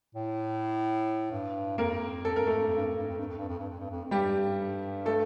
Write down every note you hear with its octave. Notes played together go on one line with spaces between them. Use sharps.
A2
G2
F2 A#3 A#4
F2 A4
G2 A#4
F2 A3 A4
G2
F2
G2
F2
G2
F2
G2
F2
G2
F2
G2
F2
G2
F2
F2
G2 G3 G4
A3 A4